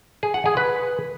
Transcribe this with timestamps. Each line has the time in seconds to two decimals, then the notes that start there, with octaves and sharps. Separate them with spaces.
0.23 G#4
0.34 F#5
0.46 G#4
0.57 B4